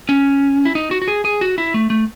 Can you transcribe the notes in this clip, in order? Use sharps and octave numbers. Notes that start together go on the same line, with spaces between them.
C#4
E4
D#4
F#4
F#4
G#4
G#4
F#4
E4
A3
A3